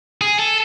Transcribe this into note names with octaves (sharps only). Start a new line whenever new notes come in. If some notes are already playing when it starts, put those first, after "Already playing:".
G#4
A4